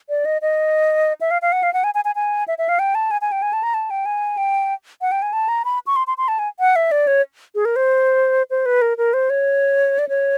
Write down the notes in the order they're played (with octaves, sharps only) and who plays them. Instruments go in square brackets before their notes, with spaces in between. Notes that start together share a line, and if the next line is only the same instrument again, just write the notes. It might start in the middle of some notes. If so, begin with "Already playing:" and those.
[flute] D5
D#5
D#5
E5
F5
F5
F#5
F5
F#5
G#5
G#5
G#5
G#5
E5
E5
F5
G5
A5
G#5
G#5
G5
G#5
A5
A#5
A5
G5
G#5
G5
F#5
G5
G#5
A5
A#5
B5
C#6
C6
C6
C6
A5
G#5
F#5
E5
D5
C#5
G#4
A#4
C5
C5
B4
A#4
A#4
C5
C#5
D5
C#5